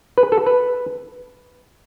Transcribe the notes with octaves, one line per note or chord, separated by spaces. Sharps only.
B4
A4
B4